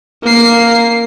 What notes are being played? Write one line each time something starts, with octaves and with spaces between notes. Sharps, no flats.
A#3 C7